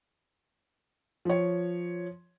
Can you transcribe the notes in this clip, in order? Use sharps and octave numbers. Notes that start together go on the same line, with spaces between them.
F3 C#5